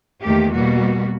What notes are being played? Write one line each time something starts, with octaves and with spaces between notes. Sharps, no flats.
E2 D#3 A3 A#3 G4
B2 G3 A#3 F#4